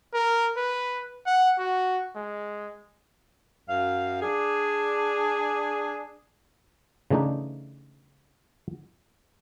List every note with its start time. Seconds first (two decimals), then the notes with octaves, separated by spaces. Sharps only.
0.14 A#4
0.57 B4
1.26 F#5
1.58 F#4
2.15 G#3
3.68 F#2 F5
4.21 D4 G#4
7.10 C#3 E3 A3 D4 D#4